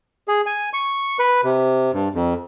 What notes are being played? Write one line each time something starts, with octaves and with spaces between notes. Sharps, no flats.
G#4
G#5
C#6
B4
C3
G2
F2